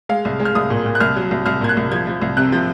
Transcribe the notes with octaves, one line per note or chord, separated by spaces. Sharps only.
G#3 F5
C2
G#3
F6
C2 D#6
A#2
A#2
F#6
C2 F6
F#3
C2
C2 F6
A#2 G#6
F#6
C2
F3 G#6
F3
C2
C3 F#6
F3